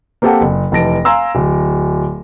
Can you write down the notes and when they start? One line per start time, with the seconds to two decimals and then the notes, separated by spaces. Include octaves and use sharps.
0.22 A#3 C4 G4 A4 F#5 A5
0.41 F#1
0.72 F1 E3 A5 A#6 D7
1.05 F5 G#5 A#5 C6 E6
1.35 D1